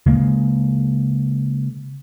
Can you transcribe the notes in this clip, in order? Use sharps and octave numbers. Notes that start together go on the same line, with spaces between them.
C#3 G#3 A#3